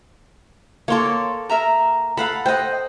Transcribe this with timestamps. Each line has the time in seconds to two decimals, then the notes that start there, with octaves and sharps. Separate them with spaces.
0.88 A#3 A4 C#5 C6 C#6
1.49 A#4 E5 A#5
2.17 A4 F5 F#5 B5
2.46 C5 D#5 F#5 G5